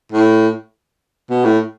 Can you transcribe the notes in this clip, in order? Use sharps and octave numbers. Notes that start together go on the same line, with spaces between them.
A2
B2
A2